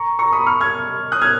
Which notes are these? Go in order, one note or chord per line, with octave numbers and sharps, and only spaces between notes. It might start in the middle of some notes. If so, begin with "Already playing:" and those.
Already playing: A#5 C#6
A#5 C#6
B5 D#6
C#6 F6
F6 G#6
D#6 F#6
F6 G#6